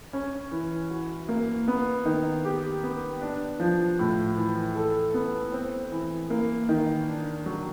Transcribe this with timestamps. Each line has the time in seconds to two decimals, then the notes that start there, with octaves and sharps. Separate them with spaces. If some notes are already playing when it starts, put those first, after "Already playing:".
0.13 C#4
0.51 E3
0.90 F#4
1.29 A#3
1.68 B3
2.05 D#3
2.45 G4
2.83 B3
3.21 D4
3.60 F3
3.99 A2
4.37 E3
4.75 A4
5.14 B3
5.52 C4
5.92 E3
6.30 A#3
6.69 D#3
7.08 D4
7.46 F#3